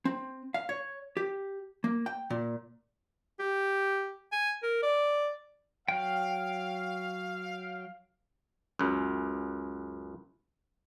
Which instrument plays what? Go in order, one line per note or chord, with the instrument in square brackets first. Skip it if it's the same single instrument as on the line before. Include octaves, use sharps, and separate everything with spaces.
[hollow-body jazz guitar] C4
F5
C#5
G4
A#3
G5
A#2
[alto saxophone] G4
G#5
A#4
D5
[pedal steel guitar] F#3 G5 [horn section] F5
[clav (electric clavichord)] C#2 F#2